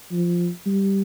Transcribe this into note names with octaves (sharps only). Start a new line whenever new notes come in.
F3
G3